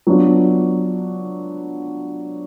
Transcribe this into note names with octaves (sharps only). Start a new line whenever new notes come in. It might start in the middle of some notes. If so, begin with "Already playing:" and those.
F#3 B3 D4 F4